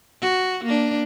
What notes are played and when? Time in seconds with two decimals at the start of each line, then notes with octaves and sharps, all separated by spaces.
0.22 F#4
0.65 A#3 D4